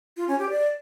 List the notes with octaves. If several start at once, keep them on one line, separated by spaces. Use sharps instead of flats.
F4
C#4
G4
D5